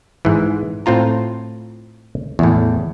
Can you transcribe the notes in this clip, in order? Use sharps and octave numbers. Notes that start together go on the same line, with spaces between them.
G#2 E3
A2 C4 F4 A#5
E2 A2